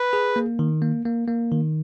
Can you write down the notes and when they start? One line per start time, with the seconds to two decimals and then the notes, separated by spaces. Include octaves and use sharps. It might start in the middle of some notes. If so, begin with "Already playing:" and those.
Already playing: B4
0.13 G#4
0.36 A#3
0.59 D#3
0.82 A#3
1.05 A#3
1.28 A#3
1.51 D#3